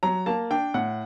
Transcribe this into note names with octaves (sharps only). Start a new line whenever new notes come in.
F#3 A#5
A#3 A5
D4 G5
A2 F#5